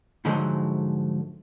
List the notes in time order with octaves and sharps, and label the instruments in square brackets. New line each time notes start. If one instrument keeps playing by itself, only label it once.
[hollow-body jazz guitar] G#2 D3 F3 F#3 G#3 A3